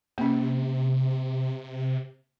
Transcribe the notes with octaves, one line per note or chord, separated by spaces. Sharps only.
C3 A#3 C#4